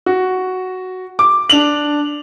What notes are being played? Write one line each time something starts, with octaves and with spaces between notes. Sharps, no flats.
F#4
D6
D4 F7 F#7